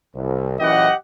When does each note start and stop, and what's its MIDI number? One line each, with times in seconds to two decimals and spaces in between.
0.14 0.57 36
0.59 0.87 42
0.59 0.87 46
0.59 0.87 52
0.59 0.94 67
0.59 0.94 75
0.59 0.94 78